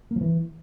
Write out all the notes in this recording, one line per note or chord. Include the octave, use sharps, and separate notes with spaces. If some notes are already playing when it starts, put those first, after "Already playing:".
A#3
F3
E3